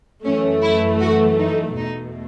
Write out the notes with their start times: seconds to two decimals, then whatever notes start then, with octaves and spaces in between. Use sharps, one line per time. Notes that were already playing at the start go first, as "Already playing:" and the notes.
0.24 F#2 E3 A3 C#4
0.63 E4
1.01 F#4
1.39 D#4
1.77 E2 B2 A3 D#4